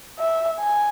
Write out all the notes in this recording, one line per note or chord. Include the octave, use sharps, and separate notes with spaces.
E5
G#5